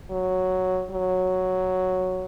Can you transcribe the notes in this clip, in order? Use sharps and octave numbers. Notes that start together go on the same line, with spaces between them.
F#3
F#3